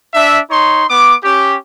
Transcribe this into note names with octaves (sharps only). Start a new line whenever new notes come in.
D4 E5
D#4 C#5 C6
B3 D6
C#4 G4